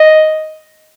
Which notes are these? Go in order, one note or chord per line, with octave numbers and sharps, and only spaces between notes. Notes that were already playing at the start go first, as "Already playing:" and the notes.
Already playing: D#5